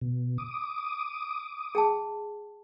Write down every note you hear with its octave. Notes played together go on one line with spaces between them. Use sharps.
B2
D6 D#6
G#4 G5 A5